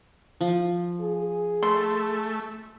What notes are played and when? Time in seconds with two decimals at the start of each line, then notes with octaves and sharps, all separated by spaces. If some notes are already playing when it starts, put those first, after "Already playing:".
0.41 F3
1.01 G#4
1.63 A3 C6